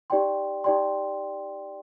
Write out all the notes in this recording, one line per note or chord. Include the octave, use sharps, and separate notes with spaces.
D#4 G4 D5 G5 C6
D#4 G4 D5 G5 C6